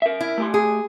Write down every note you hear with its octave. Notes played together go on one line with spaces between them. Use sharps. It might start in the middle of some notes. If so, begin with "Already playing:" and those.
A#4 E5
E4
A3 G4 C6
G#4